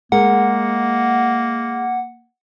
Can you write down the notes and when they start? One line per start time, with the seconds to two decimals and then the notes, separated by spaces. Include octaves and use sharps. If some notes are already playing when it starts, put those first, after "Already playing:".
0.12 G#3 A#3 A#4 F#5